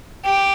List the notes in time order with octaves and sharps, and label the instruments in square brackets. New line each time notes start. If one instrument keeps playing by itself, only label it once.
[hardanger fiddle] G4